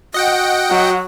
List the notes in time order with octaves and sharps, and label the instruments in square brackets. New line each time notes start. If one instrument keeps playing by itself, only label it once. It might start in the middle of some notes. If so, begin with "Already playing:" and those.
[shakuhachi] F#4 [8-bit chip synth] D#5 F#5 G5
[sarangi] F#3